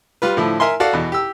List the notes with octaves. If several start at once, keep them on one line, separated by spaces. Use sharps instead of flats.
G3 F4 B4
A2 D3 F3 E4
A#4 E5 G#5 C6
F#4 A4 D5 F5
E2 B2
G4 E6